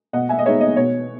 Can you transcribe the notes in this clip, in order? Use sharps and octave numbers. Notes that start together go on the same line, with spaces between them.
B2 D#5 F#5
E5 G#5
D#5
G#3 B3 D#4 C#5 E5
D#5
B2 C#5